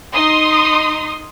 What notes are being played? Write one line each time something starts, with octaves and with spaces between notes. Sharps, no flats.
D#4 C6 D#6